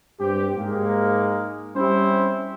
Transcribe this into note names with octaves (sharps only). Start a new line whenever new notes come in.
G2 C4 G4
G#2 G#3 A#3
G3 C4 C#4 E4 C5